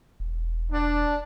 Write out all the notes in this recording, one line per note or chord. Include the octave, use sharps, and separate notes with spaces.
E1
D4